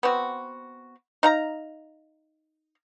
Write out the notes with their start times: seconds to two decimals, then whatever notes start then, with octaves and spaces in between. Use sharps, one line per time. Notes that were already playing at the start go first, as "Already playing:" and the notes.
0.03 B3 C4 F#4
1.23 D#4 F5 A#5